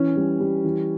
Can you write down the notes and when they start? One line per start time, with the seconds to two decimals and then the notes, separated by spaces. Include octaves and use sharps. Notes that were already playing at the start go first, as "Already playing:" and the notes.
Already playing: E3 C#4
0.16 G3
0.40 G3
0.64 E3